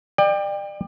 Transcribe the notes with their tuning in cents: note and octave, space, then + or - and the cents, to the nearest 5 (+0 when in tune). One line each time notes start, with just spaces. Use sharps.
D5 +35 G5 +20